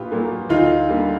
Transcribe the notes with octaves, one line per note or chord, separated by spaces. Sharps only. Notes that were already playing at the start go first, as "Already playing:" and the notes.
Already playing: A#1 A#2 A#3 F4 G4 B4
A#2 F#3 A#3
D2 D#4 F4
D3 G3 A#3